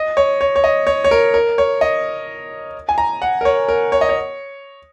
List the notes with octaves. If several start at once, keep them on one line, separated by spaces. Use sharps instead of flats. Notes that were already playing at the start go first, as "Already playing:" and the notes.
Already playing: D#5
C#5
C#5
C#5
D#5
C#5
C#5
A#4
A#4
C#5
D#5
G#5
A#5
F#5
A#4
C#5
A#4
C#5
D#5
C#5